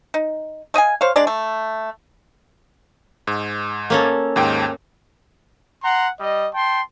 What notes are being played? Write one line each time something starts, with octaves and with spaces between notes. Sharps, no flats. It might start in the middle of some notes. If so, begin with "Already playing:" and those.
D#4
A3 D#5 F5 G#5
C5 C#5 F5
G#3 D4 D5
A3
G#2
A#3 C#4 A4
D#2 G#2 G5
F#5 A#5 C6
G3 D#5
G5 A5 C6